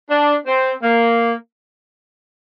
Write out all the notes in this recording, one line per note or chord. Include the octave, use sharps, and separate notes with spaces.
D4
C4
A#3